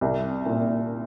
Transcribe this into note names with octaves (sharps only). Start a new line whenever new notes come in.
C2
A#2